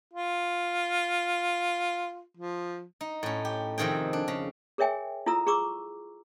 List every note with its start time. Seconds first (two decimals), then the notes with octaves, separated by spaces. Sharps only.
0.13 F4
2.37 F3
3.01 D#4
3.23 A2 C#4
3.45 G4
3.78 F2 C3 D#3 G#4 G5
4.13 D4
4.28 C#3
4.78 G#4 A#4 C#5 E5 G5 G#5
5.26 E4 F4 A4 A#5 E6
5.47 G#4 A#5 C#6 D6 E6